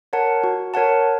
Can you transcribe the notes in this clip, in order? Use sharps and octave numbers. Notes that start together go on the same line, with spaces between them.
A#4 C#5 F#5 A5
F#4
A#4 C#5 F#5 A5